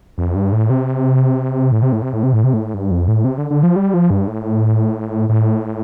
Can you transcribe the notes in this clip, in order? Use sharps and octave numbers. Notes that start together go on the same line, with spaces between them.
F2
G2
A2
C3
A2
C3
A2
C3
A2
C3
A2
C3
A2
G2
F2
A2
C3
D3
D3
F3
G3
F3
G2
A2
A2